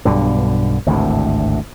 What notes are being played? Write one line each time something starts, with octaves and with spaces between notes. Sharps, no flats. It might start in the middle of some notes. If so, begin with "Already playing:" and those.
B1 G2 B2 D3
G#1 D2 A2 C3